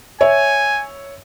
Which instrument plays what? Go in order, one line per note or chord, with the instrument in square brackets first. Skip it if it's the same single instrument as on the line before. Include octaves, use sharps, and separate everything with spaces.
[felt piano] C#5 E5 [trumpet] G#5